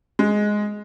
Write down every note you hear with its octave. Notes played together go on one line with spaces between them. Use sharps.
G#3